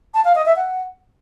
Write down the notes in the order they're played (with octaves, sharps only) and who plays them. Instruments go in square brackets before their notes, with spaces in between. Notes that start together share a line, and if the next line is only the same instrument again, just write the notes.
[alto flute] A5
F5
D#5
E5
F#5